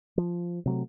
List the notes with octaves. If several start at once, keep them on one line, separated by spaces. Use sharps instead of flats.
F3
C3 F#3 A3